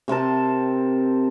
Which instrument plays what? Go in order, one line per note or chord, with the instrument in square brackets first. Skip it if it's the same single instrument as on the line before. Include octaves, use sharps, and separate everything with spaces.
[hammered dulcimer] C3 C4 A#4 A5